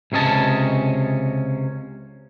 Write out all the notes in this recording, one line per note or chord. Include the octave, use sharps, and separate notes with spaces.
C#2 C3 C#4 D#5 A5